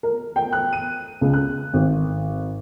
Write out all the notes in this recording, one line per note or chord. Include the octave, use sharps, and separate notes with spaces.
A#4
G5
F#6
D#7
C#2
F#6
G#1